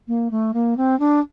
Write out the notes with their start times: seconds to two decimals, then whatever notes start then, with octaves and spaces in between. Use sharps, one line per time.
0.07 A#3
0.31 A3
0.53 A#3
0.77 C4
0.99 D4